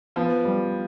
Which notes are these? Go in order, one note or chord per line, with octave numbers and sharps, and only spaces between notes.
F3 B3
G3